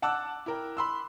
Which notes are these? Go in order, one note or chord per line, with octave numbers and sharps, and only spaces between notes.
F#5 A5 D6 E6 F#6
E4 A#4 G5
B5 C6 E6